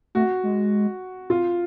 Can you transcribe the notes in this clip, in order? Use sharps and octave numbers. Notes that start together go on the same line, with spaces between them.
A3 F#4
G#3
F4